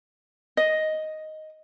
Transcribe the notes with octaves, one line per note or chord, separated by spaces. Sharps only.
D#5